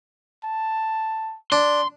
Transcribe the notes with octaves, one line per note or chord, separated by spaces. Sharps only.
A5
D4 C6